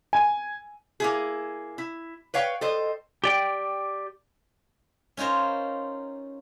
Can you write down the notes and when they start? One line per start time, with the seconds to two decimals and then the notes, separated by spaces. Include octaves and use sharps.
0.13 G#5
1.00 A#3 E4 G#4
1.78 E4
2.34 B4 C#5 F5 G5
2.61 A4 C5 D#5
3.24 G4 D5 G5
5.17 C#4 D#4 F4 A#4 C5